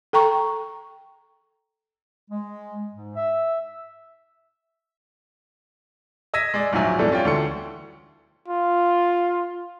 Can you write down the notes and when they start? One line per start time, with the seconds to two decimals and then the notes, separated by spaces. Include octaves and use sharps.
0.13 A4 G5 A#5 C#6
2.31 G#3
2.92 G#2
3.16 E5
6.34 D#5 E6 G#6 A#6 B6 D#7
6.54 G#3 D5
6.72 D1 A#1 G#2 F#3 E5 G#5
6.99 E3 G3 G#3 B3 D4 A4
7.12 C#4 F4 D5 G5
7.25 D2 E3 A4 C6 C#7
8.48 F4